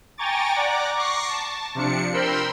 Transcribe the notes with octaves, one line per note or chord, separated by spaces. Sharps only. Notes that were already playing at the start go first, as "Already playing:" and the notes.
G5 G#5 A#5 C#6 D6 A6
D5 F#5 A#5 D6
C#6 D6 A#6 C7
A5
C3 F3 D4 C#7
A#4 C5 G5 B5 C6 E6